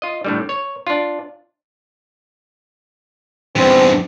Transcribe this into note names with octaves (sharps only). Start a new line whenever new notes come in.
F4 D#5
A2 D3 G3
C#5
D4 F4
E2 G2 C4